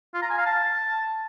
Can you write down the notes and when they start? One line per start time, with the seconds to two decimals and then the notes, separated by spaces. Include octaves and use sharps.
0.14 F4
0.22 A#5
0.30 G#5
0.38 F5
0.46 A5